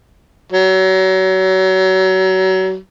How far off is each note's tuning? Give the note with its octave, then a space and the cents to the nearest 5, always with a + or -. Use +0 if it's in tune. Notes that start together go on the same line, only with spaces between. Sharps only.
F#3 +30